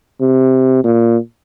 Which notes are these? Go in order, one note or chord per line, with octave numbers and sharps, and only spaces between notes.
C3
A#2